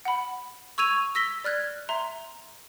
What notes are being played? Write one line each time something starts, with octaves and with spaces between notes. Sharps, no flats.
F#5 B5
C#6 E6 G#6 D#7 F7
E6 A#6 B6 G7
D5 F6 F#6 G#6
E5 A#5 C6